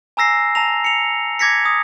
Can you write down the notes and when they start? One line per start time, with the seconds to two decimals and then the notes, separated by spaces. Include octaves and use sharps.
0.17 G#5 A#5 E6 A#6 C7
0.55 A5 A#5 A#6 F7
0.84 C#7 F7
1.39 D6 G#6 A#6 B6 C#7
1.65 D#6